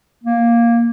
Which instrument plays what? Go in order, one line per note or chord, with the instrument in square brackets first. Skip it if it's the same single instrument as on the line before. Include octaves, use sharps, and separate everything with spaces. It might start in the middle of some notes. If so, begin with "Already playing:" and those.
[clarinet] A#3